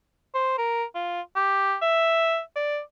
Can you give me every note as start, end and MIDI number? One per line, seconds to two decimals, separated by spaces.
0.34 0.58 72
0.58 0.84 70
0.95 1.21 65
1.36 1.76 67
1.82 2.40 76
2.56 2.80 74